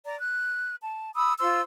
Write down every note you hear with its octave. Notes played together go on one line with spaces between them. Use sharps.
D5 A#5
F#6
A5
B5 D#6 E6
F4 C5 C6 E6